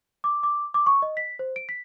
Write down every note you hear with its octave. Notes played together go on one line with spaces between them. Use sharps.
D6
D6
D6
C#6
D#5
B6
C5
D7
B6